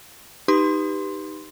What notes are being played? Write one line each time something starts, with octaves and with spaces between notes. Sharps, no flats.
D#4 G4 B4 C6